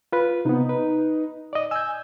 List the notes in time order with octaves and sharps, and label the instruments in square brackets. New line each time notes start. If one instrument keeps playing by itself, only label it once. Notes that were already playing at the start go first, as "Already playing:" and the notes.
[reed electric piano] F4 B4
[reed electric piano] C3 B3 [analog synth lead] D#4
[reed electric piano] B4
D5 D#5
[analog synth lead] G#5 [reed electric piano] E6 G6